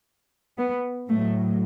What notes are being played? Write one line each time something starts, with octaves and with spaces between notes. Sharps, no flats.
B3
A2 F#3 A3